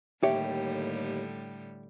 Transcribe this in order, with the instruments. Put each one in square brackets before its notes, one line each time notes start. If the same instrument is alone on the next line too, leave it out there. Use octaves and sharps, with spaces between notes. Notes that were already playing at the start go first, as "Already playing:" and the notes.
[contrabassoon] D#2 [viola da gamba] A2 D3 G3 [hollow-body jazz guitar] G4 C#5 [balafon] E5